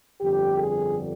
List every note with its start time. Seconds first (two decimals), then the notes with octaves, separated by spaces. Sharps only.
0.20 G1 F2 D3 G3 G4
0.57 G#4